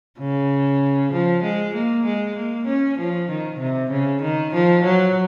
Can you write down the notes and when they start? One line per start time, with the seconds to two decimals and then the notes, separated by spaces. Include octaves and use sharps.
0.19 C#3
1.13 F3
1.43 G#3
1.75 A#3
2.05 G#3
2.36 A#3
2.67 C#4
2.98 F3
3.30 D#3
3.59 C3
3.90 C#3
4.22 D#3
4.53 F3
4.84 F#3